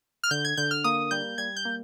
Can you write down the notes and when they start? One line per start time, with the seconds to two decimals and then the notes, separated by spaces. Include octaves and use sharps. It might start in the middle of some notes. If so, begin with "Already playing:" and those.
0.24 F6
0.31 D3 G6
0.45 G#6
0.57 D3 G6
0.71 F6
0.84 A#3 D#6
1.11 G3 G6
1.38 G3 G#6
1.56 G6
1.65 A#3